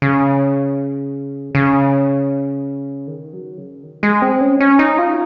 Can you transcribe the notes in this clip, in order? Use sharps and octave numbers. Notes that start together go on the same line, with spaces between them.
C#3
C#3
D#3
F#3
C#3
D#3
G#3
C4
C#4
C#4
D#4
F4